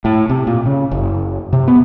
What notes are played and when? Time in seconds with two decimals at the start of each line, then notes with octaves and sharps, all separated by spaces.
0.05 A2
0.30 C3
0.47 A#2
0.66 C#3
0.91 F#1
1.53 C3
1.68 B3